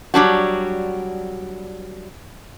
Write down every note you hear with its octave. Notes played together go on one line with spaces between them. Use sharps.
F#3 G3 D4 F#4